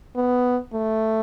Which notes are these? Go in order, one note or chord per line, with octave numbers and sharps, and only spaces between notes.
B3
A3